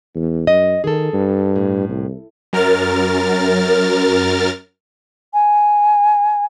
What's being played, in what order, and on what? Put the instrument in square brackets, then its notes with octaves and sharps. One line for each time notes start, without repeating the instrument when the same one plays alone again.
[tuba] E2
[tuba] F#2 [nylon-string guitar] D#5
[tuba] D#3 [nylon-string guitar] G#4 A4
[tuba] G2
[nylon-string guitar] A2
[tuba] C2
[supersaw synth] F#2 A#4 F6 A6
[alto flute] G#5